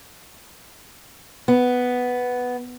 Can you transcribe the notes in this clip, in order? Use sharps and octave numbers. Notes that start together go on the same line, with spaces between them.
B3